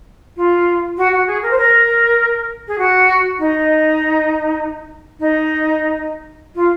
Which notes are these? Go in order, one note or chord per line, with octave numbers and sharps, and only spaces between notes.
F4
F#4
F#4
G#4
A#4
C5
A#4
G#4
F#4
D#4
D#4
F4